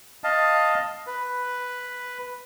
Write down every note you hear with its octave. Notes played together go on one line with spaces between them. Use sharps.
D#5 F5 A5
B4